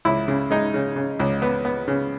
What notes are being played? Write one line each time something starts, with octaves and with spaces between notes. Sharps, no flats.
C#2 E4
C#3
G#3 D#4
C#3
C#3
C#2
B3
B3
C#3